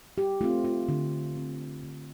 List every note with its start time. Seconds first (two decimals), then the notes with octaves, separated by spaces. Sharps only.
0.18 G4
0.41 A3 F4
0.44 C4
0.64 F4
0.88 D3
1.36 A3 C4
1.83 D3